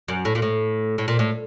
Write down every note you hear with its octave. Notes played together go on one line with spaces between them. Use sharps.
F#2
A2
A#2
A2
A2
A#2
A2